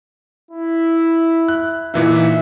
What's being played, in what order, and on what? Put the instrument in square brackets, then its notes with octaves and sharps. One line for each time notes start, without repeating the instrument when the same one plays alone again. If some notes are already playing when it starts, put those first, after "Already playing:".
[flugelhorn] E4
[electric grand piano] F#6
[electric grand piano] A#2 E3 D#4 [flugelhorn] E5